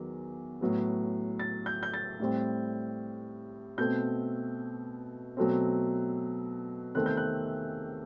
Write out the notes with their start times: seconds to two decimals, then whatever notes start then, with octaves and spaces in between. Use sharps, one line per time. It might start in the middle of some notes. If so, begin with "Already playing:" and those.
Already playing: E2 D#3 F#3
0.61 A2 F#3 B3
1.39 A6
1.66 G6
1.83 G6
1.94 A6
2.20 A2 G3 C4
3.78 B2 A3 C4 G6
5.37 B2 F#3 A3 C4
6.95 E2 C3 D#3 A3 C4 F#6
7.06 G6
7.17 F#6